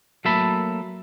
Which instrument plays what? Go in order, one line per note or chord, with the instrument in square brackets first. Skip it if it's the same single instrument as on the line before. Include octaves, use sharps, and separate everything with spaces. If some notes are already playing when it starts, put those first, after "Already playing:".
[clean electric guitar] F#3 A3 A#3 E5 A5 B5